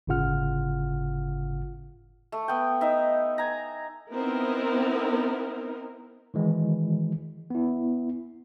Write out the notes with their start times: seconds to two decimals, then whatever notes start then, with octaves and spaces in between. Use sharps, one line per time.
0.07 G1 A2 C#3 F4 F#5 F6
2.32 A3
2.48 B3 G5
2.81 D#4 E5
3.38 G#5 A#5
4.12 B3 C4 D#4 E4 A#4
6.34 D#3 E3 G#3
7.50 B3 E4